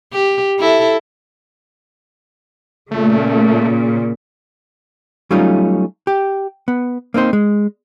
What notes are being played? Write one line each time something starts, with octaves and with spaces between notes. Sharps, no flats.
G4
E4 A4
A#2 C#3 A3
F#3 G3 A3 C#4 D#4 F4
G4
B3
A#3 C4 D#4 C5
G#3